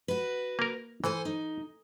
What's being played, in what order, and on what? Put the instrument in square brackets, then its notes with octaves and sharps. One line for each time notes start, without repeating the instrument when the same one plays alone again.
[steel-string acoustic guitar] F#4 B4
[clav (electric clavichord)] A#3 A#4
[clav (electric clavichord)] E3 [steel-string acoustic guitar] A4 C5 G#5
[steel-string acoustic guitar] D#4